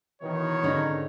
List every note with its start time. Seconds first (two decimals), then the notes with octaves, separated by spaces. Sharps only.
0.22 B2 D#3 E3 C#5
0.63 G#2 D3 C#4 D#4